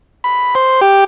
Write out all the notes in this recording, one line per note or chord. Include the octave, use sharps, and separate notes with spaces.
B5
C5
G4